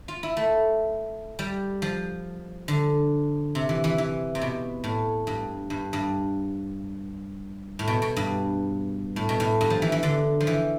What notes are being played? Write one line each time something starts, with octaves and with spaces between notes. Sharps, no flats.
F4
E4
A3
G3
F3
D3
C3
E3
E3
E3
C3
B2
A2
G2
G2
G2
A2
B2
B2
G2
A2
B2
A2
G2
F3
E3
E3
D3
F3
E3